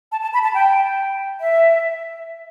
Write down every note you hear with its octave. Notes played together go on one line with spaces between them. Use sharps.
A5
A5
B5
A5
G5
E5